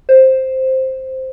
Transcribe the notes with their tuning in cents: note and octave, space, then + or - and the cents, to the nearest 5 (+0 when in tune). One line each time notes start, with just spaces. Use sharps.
C5 +5